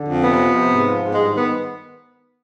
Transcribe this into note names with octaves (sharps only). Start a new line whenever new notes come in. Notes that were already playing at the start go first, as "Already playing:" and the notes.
Already playing: D3
F2
C3 B3
F3
C3
G#2
F3
G#2
B3
G2 G#3
D#3
B3